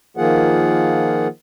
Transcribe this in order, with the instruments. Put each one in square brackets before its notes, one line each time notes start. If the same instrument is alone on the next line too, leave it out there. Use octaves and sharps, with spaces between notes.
[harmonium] D#3 F3 A#3 F4 G#4 F#5